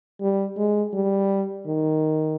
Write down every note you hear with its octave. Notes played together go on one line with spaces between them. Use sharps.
G3
G#3
G3
D#3